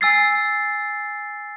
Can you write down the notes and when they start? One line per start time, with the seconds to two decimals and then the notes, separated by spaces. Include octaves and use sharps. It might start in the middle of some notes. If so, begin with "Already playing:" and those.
0.01 G#5 E6 A6 C7